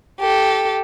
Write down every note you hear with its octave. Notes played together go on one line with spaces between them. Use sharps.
G4 A4